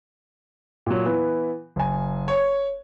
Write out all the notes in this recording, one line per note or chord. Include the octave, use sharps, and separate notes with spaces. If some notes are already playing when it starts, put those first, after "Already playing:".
A#2 F#3
E3 B3
F#1 G#5
C#5